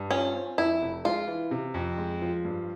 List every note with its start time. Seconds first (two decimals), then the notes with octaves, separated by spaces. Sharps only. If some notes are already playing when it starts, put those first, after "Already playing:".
Already playing: G2
0.11 C#4 F4
0.35 C4
0.58 F2 E4
0.82 F1
1.05 G#3 F4
1.28 E3
1.51 C3
1.74 F2
1.98 G#3
2.22 F3
2.45 G2